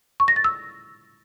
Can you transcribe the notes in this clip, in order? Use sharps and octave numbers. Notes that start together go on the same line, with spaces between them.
C#6
A#6
A6
E6